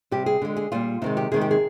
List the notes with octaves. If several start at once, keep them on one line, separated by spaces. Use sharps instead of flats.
C3 G3 G4
G#4
D3 G#3
G#4
A#2 G3 F4
C3 D#3 G#3 D#4
G4
C3 D#3 G#3 G#4
G4
G#4